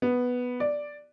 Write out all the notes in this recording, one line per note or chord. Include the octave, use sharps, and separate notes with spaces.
B3
D5